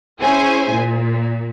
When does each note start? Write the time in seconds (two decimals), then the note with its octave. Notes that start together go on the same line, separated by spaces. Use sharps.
0.21 C#4 E4 G#4 C5 G#5
0.72 A#2